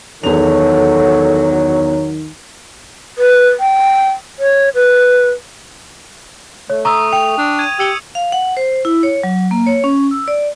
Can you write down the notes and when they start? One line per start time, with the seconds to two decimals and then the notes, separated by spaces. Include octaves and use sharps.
0.24 E2 D#3 F#3 A4 F7
3.18 B4
3.60 G5
4.39 C#5
4.75 B4
6.70 A3 C#5
6.85 A#5 C#6 D#6 E6
7.13 G5 F7
7.37 D4
7.59 G#6 D#7
7.79 G4 E6 C#7 G7
8.15 F5
8.32 F#5
8.57 C5
8.85 E4
9.03 C#5
9.23 F#3
9.51 A#3
9.66 C#5
9.84 C#4
10.11 E6
10.28 D5